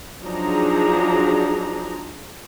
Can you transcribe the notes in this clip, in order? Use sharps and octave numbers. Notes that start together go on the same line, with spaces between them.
F3 F#3 D4 D#4 G#4 A#5